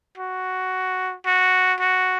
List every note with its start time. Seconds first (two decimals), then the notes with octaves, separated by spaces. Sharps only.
0.18 F#4
1.26 F#4
1.80 F#4